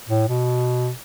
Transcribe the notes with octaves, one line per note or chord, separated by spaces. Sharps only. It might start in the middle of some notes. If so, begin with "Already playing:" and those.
A2
B2